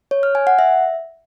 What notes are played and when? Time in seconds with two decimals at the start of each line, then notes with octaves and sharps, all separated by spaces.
0.11 C#5
0.23 F6
0.35 G#5
0.47 F#5
0.59 E5